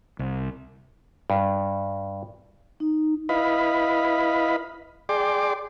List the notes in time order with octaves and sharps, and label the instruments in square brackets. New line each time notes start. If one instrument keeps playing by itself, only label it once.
[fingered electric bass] C2
[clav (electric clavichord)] G2
[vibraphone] D#4
[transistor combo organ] E4 B4 D#5 F5 B5
G#4 D5 G5 C6 D6